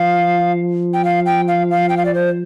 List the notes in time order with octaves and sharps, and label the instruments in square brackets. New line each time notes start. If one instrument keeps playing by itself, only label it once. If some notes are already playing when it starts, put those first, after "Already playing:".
Already playing: [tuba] F3 [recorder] F5
[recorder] G5
F5
G5
F5
F5
G5
F5
D5
C5